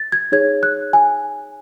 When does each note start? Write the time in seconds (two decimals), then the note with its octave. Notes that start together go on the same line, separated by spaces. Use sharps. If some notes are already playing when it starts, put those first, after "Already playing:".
Already playing: A6
0.12 G#6
0.32 D#4 G#4 C#5 G#6
0.63 F#6
0.93 G#5